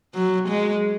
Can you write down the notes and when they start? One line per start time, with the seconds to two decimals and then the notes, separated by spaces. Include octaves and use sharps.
0.14 F#3
0.49 G#3